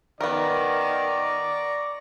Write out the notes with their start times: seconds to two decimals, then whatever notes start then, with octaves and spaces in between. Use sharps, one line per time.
0.21 D#3 B3 A#4 D5 A#5 C#6